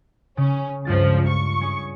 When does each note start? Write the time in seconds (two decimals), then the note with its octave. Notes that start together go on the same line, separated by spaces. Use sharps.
0.37 C#3 C#4
0.85 C#2 G2 F3 F4 A6
1.28 C#6
1.61 C#4 G#4